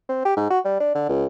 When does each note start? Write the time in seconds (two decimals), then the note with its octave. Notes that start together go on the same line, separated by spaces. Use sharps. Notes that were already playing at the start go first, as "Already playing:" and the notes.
0.09 C4
0.25 G4
0.37 G#2
0.50 F#4
0.65 G3
0.80 D4
0.95 D3
1.09 C#2